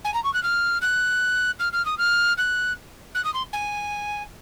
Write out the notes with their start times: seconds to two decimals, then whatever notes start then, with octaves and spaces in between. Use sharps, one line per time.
0.04 G#5
0.14 A#5
0.24 C#6
0.33 F#6
0.43 F6
0.81 F#6
1.59 F6
1.72 F6
1.85 D#6
1.98 F6
2.37 F#6
3.15 F#6
3.24 D#6
3.34 C6
3.53 G#5